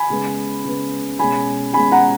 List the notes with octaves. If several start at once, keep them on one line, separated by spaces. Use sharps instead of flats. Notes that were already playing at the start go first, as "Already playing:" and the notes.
Already playing: G#5 B5
C#3 G#3 B3
C#3 G#3 B3
B2 G#3 C#4 G#5 B5
B2 G#3 C#4 G#5 B5
F#5 A#5